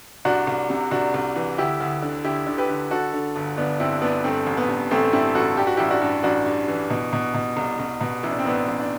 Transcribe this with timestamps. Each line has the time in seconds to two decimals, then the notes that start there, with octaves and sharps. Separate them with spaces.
0.25 C2 D4 F#4
0.47 C2
0.70 C3
0.91 C2 D4 F#4
1.14 C2
1.36 E3
1.58 D2 E4 G4
1.80 D2
2.02 D3
2.24 D3 E4 G4
2.47 D3
2.58 G4 B4
2.69 D3
2.91 D3 F#4 A4
3.13 D3
3.36 G1
3.58 G1 B3 D4
3.80 G2 C4 E4
4.02 G1 B3 D4
4.24 G2 A3 C4
4.46 A1
4.57 B3
4.68 G2
4.91 A1 A3 C4
5.13 G2 C4 E4
5.35 A1 F#4 A4
5.57 G2 G4
5.67 F#4
5.77 A1 E4 G4
5.91 D4 F#4
6.01 G2
6.23 A1 D4 F#4
6.46 G2
6.68 E3
6.90 B2
7.13 B2
7.34 B2
7.57 C2
7.80 C2
8.01 B2
8.23 A1 E4
8.31 D4
8.39 C4
8.45 A1 B3 D4
8.68 A1
8.80 D4